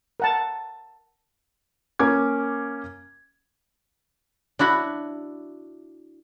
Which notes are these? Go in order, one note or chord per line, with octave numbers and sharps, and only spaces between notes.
A#4 F#5 A5
A#3 C#4 D6 G#6
D4 E4 F#4 B5